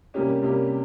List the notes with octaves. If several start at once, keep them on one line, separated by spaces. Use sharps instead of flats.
C3 G3 A#3 C#4 G4
C3 G3 A#3 C#4 G4